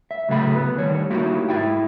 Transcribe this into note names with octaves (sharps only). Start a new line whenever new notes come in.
E5
A2 C#3 F#3 A4 E5 B5
B3
D2 D#3 G3 C#5
A#3 D#4 E4 F#4 G4
G#2 F#3 E4 E5 G5